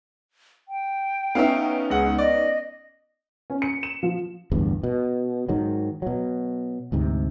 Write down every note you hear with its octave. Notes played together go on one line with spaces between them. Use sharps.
G5
B3 C#4 D#4 E5 F5
C#2 G#4 F#5
D5 D#5
C#4
C#7
E7
F3
D1 G1 E2 G2
B2
G#2 D#3 F#3
B2 F#3
D2 G#2 C3